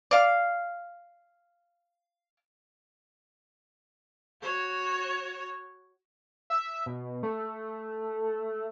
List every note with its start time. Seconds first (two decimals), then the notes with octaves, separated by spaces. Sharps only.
0.11 D5 F5
4.42 F#4 C#5
6.50 E5
6.86 B2
7.23 A3